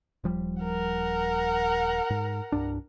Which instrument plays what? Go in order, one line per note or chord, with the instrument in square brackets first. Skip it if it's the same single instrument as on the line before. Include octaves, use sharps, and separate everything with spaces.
[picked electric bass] D#1 F3 G3
[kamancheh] A#4 F#5
[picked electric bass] G#2
C2 G2 D4